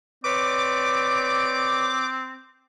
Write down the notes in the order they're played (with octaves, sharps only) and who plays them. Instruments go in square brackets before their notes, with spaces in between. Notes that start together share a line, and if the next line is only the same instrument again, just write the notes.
[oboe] C4 [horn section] B4 C#5 D5 [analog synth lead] D6